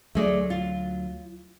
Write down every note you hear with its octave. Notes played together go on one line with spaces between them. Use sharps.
D2 F#3 A3 G#4 D5
F4